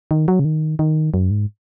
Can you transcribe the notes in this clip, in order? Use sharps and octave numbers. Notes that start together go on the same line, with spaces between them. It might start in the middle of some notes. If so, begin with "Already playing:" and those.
D#3
F#3
C#3
D#3
D#3
F#2
G#2